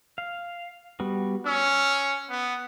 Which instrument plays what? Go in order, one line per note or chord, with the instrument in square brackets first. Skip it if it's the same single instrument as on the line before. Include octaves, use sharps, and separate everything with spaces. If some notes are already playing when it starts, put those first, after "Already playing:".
[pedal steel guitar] F5
G3 B3 F#4
[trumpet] C#4 [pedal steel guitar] E6
[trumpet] B3